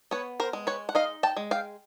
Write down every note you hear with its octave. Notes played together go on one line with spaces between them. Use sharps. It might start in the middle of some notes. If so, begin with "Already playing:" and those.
B3 B4 C#5
A#4 C5
G#3
B4 C#5
F#5
D#4 D#5 F5
G5 A5
G#3
F5 G5